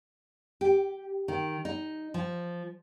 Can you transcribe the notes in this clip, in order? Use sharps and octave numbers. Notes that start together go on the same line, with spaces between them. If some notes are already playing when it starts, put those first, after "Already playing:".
G4
D#3
D#4
F3